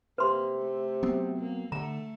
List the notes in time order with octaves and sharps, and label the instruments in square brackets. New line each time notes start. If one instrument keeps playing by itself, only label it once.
[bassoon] C3 [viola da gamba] A#3 [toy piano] B4 C6
[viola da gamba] A3
[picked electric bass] F#3 B3 C4
[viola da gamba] A#3
[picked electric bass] D3 [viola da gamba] A3 [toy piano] A#5